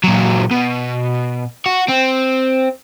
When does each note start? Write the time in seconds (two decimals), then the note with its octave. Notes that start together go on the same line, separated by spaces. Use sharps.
0.04 A#2 F#3
0.51 B2
1.66 F#4
1.88 C4